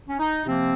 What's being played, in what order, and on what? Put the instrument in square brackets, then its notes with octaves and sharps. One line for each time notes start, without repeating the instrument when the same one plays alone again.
[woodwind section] C#4
D#4
C3 F3 A#3 C4